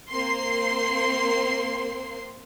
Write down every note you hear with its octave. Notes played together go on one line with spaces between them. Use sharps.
A#3 C4 C6 C7